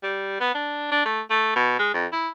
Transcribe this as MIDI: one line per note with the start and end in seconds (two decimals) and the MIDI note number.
0.03 0.39 55
0.40 0.54 59
0.55 0.87 62
0.91 1.04 62
1.05 1.21 57
1.30 1.53 57
1.56 1.77 47
1.79 1.91 56
1.94 2.06 41
2.13 2.29 64